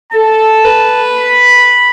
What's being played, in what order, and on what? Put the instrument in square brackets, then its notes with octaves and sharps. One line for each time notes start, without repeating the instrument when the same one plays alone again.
[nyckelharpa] A4 [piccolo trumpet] A5
[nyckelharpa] B4
[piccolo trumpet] B5